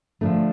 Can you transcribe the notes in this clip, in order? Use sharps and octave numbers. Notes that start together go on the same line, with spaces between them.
D3 F3 A3 D4